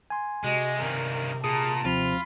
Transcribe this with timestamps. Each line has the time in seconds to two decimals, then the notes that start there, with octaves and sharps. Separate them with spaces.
0.10 G#5 C6
0.44 C3 G#3 F#4 G4 D#5
0.80 G2 D#3 A#4
1.44 A#2 G#4 A5 A#5 D#6
1.85 D#2 F3 C4 F4 B5